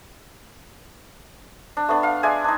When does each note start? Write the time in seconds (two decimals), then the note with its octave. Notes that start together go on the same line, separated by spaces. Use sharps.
1.77 D4
1.89 A3 B3 D4
2.03 F5
2.23 G#3 D5 E5 G#5
2.44 D4 D#4